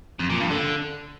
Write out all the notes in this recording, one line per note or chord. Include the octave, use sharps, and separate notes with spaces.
F2
A#2
G2
D3